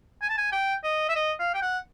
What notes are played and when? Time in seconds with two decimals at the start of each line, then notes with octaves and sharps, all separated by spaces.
0.22 G#5
0.29 A5
0.37 G#5
0.52 G5
0.84 D#5
1.09 E5
1.16 D#5
1.39 F5
1.54 G5
1.62 F#5